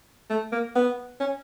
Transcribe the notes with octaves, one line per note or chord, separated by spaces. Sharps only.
A3
A#3
B3
C#4